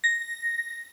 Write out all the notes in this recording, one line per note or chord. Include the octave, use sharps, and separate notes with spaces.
A#6